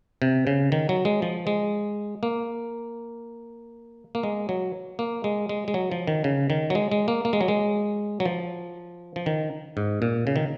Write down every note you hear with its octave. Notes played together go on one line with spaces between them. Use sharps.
C3
C#3
D#3
F#3
G#3
F3
G#3
A#3
A#3
G#3
F#3
A#3
G#3
G#3
G#3
F#3
F3
D#3
C#3
D#3
F#3
G#3
G#3
A#3
A#3
G#3
F#3
G#3
F#3
F3
F3
D#3
G#2
A#2
C#3
D#3